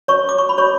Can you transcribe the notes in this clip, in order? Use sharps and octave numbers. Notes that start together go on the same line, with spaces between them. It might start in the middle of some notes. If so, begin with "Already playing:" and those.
C#5 C#6
D6
C#6
B5
C#5 C#6